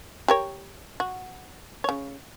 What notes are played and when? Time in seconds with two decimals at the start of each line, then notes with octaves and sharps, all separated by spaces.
0.28 G4 A#4 C#5
1.00 F#4
1.84 C#3 C#5